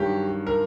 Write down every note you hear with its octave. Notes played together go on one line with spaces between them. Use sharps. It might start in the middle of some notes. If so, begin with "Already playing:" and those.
Already playing: G2 D#3 F#3 G4
A#4